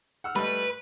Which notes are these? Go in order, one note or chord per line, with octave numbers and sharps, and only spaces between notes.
F#5 E6 F6
G3 A3 B4 D#5